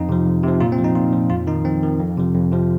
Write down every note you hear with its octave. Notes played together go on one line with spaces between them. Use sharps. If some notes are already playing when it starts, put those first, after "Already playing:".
Already playing: F2 D#4
C3 F3
F2
C3 F3
A#2 F4
C4
F3
D#4
A#2 F4
F3
F2 F4
D#3 D#4
F2 C4
D#3
F2
C3 F3
F2
C3 F3